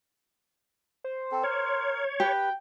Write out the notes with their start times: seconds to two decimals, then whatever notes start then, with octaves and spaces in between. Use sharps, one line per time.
1.04 C5
1.32 C4 A4
1.43 A#4 C#5
2.20 G4 B4 G5